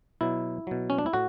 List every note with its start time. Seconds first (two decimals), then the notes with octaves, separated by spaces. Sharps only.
0.21 B2 F#3 E4
0.67 B2 F#3
0.90 C#4
0.98 D4
1.06 E4
1.13 A2 F#4